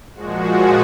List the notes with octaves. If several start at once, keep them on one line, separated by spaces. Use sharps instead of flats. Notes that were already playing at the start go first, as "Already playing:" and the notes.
A#2 F3 G#3 F#4
F#4